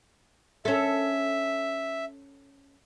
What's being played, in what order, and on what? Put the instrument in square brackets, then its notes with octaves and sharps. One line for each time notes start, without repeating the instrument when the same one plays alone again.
[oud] C#4 A4 [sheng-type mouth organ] E5